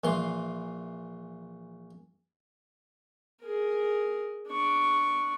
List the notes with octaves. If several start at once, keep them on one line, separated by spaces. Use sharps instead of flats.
A#1 E3 C6
G#4 A#4
D4 C#6